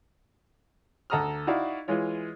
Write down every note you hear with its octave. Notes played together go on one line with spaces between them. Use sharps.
D2 A4 F#5 A#5 D#6 F6
D#4 E4 F#4 D5 F5
E3 G#3 F4 C#5